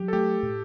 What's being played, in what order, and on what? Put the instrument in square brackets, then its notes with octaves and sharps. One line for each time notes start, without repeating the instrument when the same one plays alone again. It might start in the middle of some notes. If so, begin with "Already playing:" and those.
Already playing: [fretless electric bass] F#3 [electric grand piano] G4
[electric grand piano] A4
[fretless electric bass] A3 [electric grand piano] G4
[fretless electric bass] A2